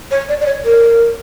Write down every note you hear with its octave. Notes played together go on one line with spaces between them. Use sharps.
C#5
D5
D5
C#5
A#4